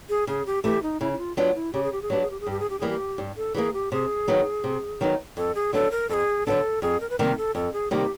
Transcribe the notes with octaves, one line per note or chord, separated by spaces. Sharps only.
G#4
C#3 G#4
G4
E3 A3 G4
D#4
C#3 E4
E4
F4
F#3 B3 D4 F4
E4
C#3 G4
G#4
G4
G#4
F#3 B3 D4 G4
G#4
G4
G#4
G2 G4
G#4
G4
E3 G3 A#3 G#4
G4
G2
A4
E3 G3 A#3 G#4
G4
C3 G#4
D#3 F#3 B3 D#4
C3
D#3 F#3 B3 D#4
F2 A4
G#4
D3 F#3 B3 D4 A4
A#4
F2 G#4 A4
D3 F#3 B3 D4 A4
F2 G#4
A#4
B4
C3 D#3 G3 A#3 A#4
A4
F2 A4
G#4
C3 D#3 G3 A#3 G4